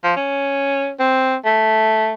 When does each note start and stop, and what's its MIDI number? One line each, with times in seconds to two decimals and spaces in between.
0.03 0.12 53
0.16 0.91 61
0.99 1.35 60
1.45 2.14 57